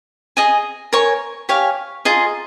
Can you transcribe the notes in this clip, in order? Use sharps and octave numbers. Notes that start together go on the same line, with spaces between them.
G#4 D#5 G#5 D#6
A#4 C#5 G#5 C#6
G4 C#5 F5 G#5
F4 G#4 D#5 A#5